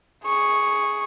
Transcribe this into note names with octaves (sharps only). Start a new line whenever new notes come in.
G#4 C#6